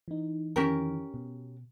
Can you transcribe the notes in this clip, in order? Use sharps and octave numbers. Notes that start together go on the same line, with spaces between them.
E3 D#4
F2 D#3 E3 C#4 G4 A#4
B2